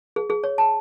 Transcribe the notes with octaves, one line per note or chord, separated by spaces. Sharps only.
G#4
G#4
C#5
A5